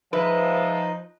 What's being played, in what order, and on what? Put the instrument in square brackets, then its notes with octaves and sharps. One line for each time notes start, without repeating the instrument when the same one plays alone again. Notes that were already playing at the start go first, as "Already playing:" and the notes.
[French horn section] F3 [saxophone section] G#3 E5 [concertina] D#4 D#5 [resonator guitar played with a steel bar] B4